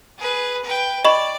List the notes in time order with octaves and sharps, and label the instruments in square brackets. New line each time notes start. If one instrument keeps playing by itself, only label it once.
[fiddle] G#4 B4
B4 G5
[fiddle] D5 [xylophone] D#5 B5 C#6